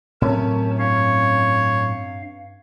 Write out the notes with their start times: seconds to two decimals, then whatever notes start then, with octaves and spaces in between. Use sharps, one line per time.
0.22 A2 C3 F#3 C#4 A#4 A5
0.79 G2 C#5 F5